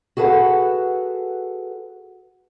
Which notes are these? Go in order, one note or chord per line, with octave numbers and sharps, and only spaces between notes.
F#4 G#4 A4 B4 F#5